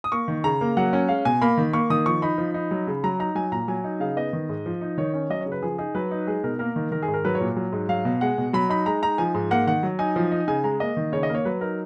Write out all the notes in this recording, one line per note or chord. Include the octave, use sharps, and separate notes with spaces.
D#6
A#3 C#6
D#3
C#3 A#5
A#3
F#3 F#5
C#4
G#3 F5
B2 G#5
A#3 B5
D#3
A#3 C#6
D#3 D#6
F3 C#6
D#4 B5
F3
D#4
F#3
C#3
F#3 A#5
D#4 A#5
F#3 G#5
A#2 A#5
F#3 G#5
D#4
C#3 F5
B3 D#5
D#3
G#2
F3
D#4
D#3 C#5
C#4
F#3 D#5
C#3 C#5
B4
F3 G#4
D#4 G#4
F#3 B4
D#4
G#3 G#4
B2 A#4
A#3 A#4
D#3
D#3 A#4
G#4
G#2
A#4
F#3 B4
C#5
A#2
F#3
G#2
F#3 F5
B2
G#3 F#5
B2
F#3 B5
D#4 B5
G#3 A#5
D#4 A#5
F3 G#5
G#2
A#3 F#5
D#3 F#5
F#3
D#4 G#5
F3
D#4
C#3 G#5
G#3 A#5
A#3 D#5
D#3
C#3 C#5
D#5
A#3
C#5
F#3 B4
D#4 A#4